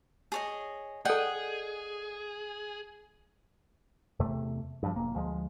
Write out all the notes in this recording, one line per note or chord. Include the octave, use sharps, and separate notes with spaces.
G#4 C#5 D#5
G#4 A4 D5 D#5 F#5 G5
E2 C3 A3
G2 F3
E1 A#3
D2 F3 G#3